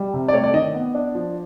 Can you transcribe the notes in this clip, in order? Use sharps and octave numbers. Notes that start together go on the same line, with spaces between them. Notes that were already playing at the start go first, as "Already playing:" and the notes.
Already playing: G3
C3
D5
A3 C#5
D5
D#3 D#5
B3
D4
F3